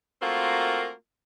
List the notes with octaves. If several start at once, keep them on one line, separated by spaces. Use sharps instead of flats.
A3 A#3 C4 F4 F#4 A#4